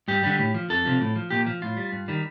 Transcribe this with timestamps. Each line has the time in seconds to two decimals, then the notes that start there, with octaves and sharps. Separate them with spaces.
0.08 G2 G4
0.23 D3 G3
0.38 A2
0.54 F3
0.69 F2 A4
0.85 C3 F3
1.01 A2
1.16 F3
1.30 A#2 G4
1.47 F3
1.62 A2 F4
1.77 G3
1.92 G2
2.08 D#3 G3